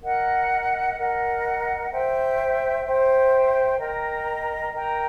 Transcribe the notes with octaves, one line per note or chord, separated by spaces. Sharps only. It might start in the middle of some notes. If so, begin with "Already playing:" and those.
A#4 D#5 F#5
A#4 D#5 F#5
C5 E5 G5
C5 E5 G5
A#4 D#5 G5 A#5
A#4 D#5 G5 A#5